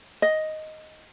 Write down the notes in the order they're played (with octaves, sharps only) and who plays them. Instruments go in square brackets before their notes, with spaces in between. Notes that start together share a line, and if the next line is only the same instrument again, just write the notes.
[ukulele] D#5